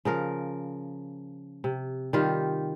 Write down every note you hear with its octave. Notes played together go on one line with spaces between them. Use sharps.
C#3 F3 A#4
C3
D#3 G3 F4 G4